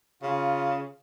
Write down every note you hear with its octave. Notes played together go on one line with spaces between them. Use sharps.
C#3 F4